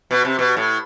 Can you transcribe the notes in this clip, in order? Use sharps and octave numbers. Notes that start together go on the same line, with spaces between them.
B2
C3
B2
A2